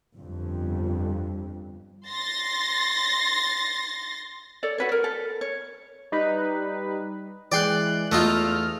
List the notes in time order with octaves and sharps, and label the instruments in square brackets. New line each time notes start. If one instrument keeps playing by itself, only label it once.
[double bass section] G1 F2 G3
[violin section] C6 A6 A#6
[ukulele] A4 C#5 D5
F#4 B4 C#5
A#4
A4
C#5
[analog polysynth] G3 D#4 B4
[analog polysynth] E3 G#3 F#6 [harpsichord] D5 G5 C6
[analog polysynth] E2 F6 [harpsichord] A3 D#4 F4